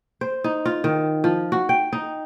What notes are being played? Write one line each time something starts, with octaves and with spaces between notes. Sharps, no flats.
C5
D#4
F4
D#3
F3
F#4
G5
D#4